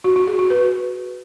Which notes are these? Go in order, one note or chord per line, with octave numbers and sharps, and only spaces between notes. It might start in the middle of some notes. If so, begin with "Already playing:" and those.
F#4
F#4
G#4
F#4
B4